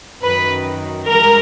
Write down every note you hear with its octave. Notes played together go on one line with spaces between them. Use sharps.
F#2 D#3 F#3 B4
G2 E3 G#3 A#4